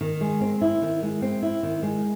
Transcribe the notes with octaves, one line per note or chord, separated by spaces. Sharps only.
D#3
G#3
C4
E4
D#3
G#3
C4
E4
D#3
G#3